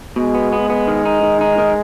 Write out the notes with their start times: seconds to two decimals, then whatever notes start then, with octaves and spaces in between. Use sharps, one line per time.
0.16 B2 G#3
0.35 B3
0.53 B3
0.70 B3
0.87 D#3
1.05 D#4
1.23 D#3
1.41 D#4
1.58 D#3